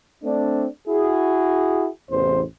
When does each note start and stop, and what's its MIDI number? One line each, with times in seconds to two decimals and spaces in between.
0.23 0.66 57
0.23 0.66 60
0.23 0.66 62
0.88 1.88 64
0.88 1.88 66
0.88 1.88 68
2.11 2.42 33
2.11 2.42 40
2.11 2.42 48
2.11 2.42 72